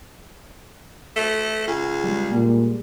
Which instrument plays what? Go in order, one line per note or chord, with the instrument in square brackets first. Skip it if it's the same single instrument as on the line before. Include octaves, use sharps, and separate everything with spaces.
[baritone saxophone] A3
C#2
[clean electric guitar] G3 G#3
[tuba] A#2